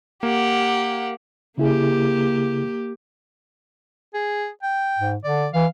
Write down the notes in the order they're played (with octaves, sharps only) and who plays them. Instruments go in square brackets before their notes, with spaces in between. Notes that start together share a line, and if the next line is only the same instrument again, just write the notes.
[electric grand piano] A#3 [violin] G4 F#5
[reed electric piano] C#3 E4 G#4 [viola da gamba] A#3 G4
[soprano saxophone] G#4
G5
[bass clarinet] G#2
[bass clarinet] D3 [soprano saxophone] D5
[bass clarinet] E3 [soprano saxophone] F5